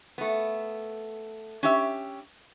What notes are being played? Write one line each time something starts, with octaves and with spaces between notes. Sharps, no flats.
A3 B3
C#4 G4 E5